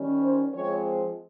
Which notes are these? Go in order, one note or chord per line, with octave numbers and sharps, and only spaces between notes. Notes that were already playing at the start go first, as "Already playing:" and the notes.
Already playing: D#3 G3 C#4
C5
F3 G#3 C4 C#5